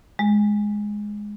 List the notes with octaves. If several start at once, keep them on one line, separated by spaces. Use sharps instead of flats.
G#3